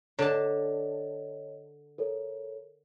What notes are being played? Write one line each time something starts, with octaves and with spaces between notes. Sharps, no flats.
D3 C#5 D#5 A5
A4 A#4 C#5